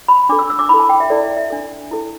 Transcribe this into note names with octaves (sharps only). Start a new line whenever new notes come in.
B5
D4 A4 D6
E6
E6
D6
E4 A4 B5
A5
G5
E5
E4 A4 D5
E5
E5
D4 A4
E4 A4